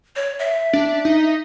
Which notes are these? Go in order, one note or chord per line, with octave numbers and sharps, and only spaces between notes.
C#5
E5
D4
D#4